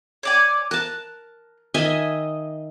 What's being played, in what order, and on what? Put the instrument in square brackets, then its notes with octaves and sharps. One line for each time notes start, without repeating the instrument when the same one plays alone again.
[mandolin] C#5 D5 G#5
[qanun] A#4 A5 [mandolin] F#6
[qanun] D#3 E5 G#5 [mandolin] D#5